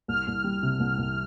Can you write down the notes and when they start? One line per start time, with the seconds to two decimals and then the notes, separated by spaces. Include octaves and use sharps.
0.08 C2 F6
0.27 C2
0.44 G3
0.63 C3
0.80 C2
0.98 C2